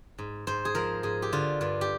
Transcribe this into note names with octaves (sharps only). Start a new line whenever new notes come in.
G#2
G#2 C5
G#4
F3 A#4
G#2 G#4
G4
D3 F4
G2 F4
G4